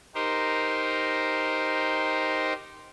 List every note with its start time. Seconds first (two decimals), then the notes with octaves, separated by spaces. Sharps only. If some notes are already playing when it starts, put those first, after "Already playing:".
0.15 D#4 G4 A#4 C5